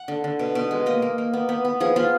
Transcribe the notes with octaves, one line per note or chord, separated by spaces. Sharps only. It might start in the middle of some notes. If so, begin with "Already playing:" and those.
Already playing: F#5
D3
D3
B2
B2
G#3
A#3 D#5
A#3
A#3
B3
B3
B3
F3 G#4
B3 F4